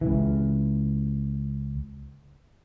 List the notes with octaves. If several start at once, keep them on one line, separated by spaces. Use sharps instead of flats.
C#2 E3